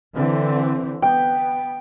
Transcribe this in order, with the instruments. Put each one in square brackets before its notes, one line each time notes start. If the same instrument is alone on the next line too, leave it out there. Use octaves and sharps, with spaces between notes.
[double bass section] D3 E3 C4
[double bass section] B3 [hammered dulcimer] G5